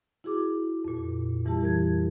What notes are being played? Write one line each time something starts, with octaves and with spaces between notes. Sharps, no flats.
E4 F#4 G#4 D6
F2 A#2
F2 E3 G3 E4 G4 A5
A#4 G#6